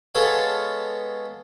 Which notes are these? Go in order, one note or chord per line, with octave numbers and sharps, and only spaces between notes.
G#3 B3 A4 C#5 F5